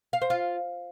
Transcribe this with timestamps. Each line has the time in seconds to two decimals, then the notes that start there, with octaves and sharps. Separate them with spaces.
0.13 F5
0.22 C5
0.30 F4